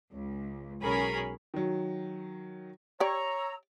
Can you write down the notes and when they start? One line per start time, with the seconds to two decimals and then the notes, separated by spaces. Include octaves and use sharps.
0.12 C#2
0.82 B1 C#4 G#4 A#4 B5
1.54 D#3 F#3
3.00 G4 C#5 D5 A#5 E6